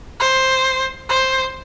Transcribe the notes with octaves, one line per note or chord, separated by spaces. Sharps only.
C5
C5